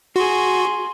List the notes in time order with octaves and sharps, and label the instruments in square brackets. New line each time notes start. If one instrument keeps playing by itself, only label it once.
[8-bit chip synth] F#4 [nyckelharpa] G#4 C6